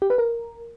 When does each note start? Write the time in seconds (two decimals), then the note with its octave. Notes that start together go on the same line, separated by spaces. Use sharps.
0.02 G4
0.10 B4
0.18 A#4